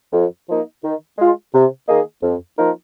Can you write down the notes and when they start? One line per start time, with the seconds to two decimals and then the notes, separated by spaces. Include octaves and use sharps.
0.12 F2
0.48 F3 A#3 D#4
0.83 D#3
1.18 G#3 F4
1.53 C3
1.87 D#3 A#3 G#4 D#5
2.22 F2
2.58 F3 A#3 D#4 A#4